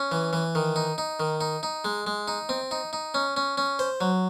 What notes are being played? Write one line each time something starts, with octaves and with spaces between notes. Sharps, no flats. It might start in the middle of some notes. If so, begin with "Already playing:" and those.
Already playing: C#4
E3
E3
D#3
D#4
D#4
D#3
D#4
D#4
G#3
G#3
D#4
C4
D#4
D#4
C#4
C#4
C#4
C5
F#3